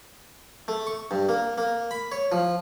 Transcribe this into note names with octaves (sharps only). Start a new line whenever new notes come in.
A3
C#6
G2
A#3
A#3
B5
C#5
F3